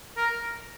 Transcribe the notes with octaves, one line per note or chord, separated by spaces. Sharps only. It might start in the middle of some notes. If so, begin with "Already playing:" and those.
A#4